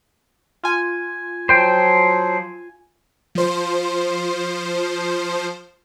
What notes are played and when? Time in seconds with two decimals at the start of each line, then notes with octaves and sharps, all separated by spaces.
0.63 F4 G#5
1.49 F3 F#3 C5 G5
3.35 F3 C5